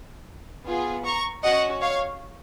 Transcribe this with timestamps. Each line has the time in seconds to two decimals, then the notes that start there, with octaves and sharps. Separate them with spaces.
0.66 B3 F4 G#4
1.05 A#5 C#6
1.43 C#4 F#4 D#5 F#5
1.81 C#5 F5